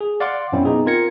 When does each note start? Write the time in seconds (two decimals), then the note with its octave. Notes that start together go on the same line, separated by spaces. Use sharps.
0.01 G#4
0.20 D5 F5 F#5 C6 D6
0.52 F#2 B2 C4 C#4 E4
0.65 B3 D#4 G#4
0.86 C4 F4 A#4 G#6 A#6 C#7